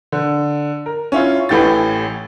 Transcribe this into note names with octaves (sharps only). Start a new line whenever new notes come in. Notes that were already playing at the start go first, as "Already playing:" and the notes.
D3
A#4
C#4 E4 F4
A1 A2 E3 G4 A6